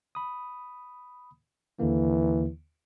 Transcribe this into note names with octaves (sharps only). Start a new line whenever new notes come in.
B5 D#6
D#2 D3 E3 A#3